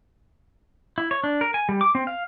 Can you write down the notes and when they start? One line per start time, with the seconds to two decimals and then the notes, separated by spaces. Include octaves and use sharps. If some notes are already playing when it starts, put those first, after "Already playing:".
0.98 E4
1.11 C#5
1.24 D4
1.41 A#4
1.54 G#5
1.69 G3
1.81 D6
1.95 C4
2.07 F5